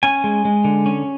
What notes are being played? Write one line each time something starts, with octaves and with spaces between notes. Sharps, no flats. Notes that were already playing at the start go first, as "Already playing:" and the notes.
C#4 G#5
G#3
G#3
D3
C#4